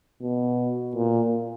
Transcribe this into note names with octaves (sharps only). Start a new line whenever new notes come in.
B2
A#2